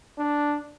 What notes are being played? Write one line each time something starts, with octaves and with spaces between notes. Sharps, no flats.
D4